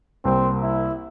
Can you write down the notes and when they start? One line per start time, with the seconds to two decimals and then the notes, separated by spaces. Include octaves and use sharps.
0.25 C2 A#3 C4 C5
0.62 E4